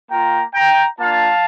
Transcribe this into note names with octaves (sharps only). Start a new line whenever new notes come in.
A#3 F4 G5 A#5
G5 A#5
A#3 D4 F4 F5 A5